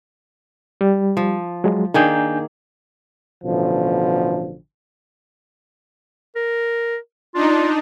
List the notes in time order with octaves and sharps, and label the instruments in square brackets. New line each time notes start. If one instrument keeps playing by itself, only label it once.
[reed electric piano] G3
[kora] F3
[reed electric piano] F#3 G#3
[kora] D#3 A#3 G#4 [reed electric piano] D4 G#5 G6
[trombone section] A1 B2 D3 F3
[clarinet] A#4
[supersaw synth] D4 D#4 [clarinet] F4